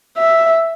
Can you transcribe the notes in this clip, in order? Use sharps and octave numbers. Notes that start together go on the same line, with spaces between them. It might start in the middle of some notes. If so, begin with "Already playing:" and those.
E5